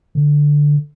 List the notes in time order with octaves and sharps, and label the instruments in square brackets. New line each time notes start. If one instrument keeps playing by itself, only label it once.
[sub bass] D3